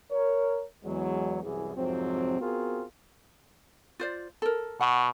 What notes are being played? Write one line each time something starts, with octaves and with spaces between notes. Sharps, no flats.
A#4 C#5
E2 F#3 G#3
C2 F#2 E3 G#4
F2 G#2 C3 F#3 C4
B3 C4 F4 F#4 G#4 A#4
F4 C5 D5
A4 A#4
B2 F#5